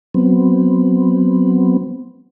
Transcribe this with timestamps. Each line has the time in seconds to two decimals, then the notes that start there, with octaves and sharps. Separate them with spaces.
0.14 F#3 B3 C4